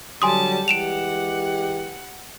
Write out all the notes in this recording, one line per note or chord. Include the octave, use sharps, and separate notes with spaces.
D3 F#3 G3 G#5 A5 C6 D#6
E3 G#3 G4 F#5 D7 E7 F7